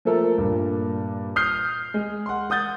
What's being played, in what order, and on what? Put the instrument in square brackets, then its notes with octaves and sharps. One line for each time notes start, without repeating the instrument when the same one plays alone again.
[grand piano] F3 A3 A#3 A4 A#4
G2 A#2
D#6 F6 G6 C7
G#3
F#5 C6
F#5 D#6 G6 A6